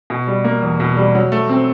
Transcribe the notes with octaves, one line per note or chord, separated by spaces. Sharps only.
B2
G3
A#3
E2
B2
G3
F#3
A3
C4